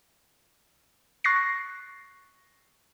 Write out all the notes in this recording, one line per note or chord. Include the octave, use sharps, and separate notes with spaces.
C#6 F#6 A6 A#6 C7